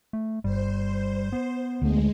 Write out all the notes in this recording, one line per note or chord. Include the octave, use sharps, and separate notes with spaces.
A3
G1 G3 C5
B3
D2 G#3 A3